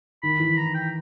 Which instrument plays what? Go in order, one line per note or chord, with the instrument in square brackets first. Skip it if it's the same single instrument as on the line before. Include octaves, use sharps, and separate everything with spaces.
[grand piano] D#3 [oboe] B5
[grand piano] E3
[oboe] A#5
G5